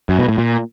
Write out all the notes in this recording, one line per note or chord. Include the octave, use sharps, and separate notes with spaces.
F#2
B2
A2
A#2